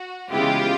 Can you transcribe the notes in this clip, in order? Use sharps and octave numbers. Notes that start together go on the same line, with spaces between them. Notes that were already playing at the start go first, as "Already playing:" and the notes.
Already playing: F#4
C#3 E3 G#3 B3 E4 F4 G4